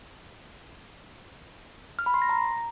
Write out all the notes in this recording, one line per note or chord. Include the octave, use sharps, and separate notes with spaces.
F6
B5
C6
A#6
A#5